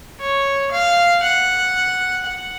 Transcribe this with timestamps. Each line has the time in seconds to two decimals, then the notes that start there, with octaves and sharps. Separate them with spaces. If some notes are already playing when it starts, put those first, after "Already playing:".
0.20 C#5
0.72 F5
1.22 F#5
2.26 F#5